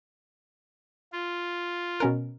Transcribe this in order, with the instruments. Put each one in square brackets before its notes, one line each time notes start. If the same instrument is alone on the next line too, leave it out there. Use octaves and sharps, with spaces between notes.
[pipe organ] F4
[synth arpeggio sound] B2 C#4 A#4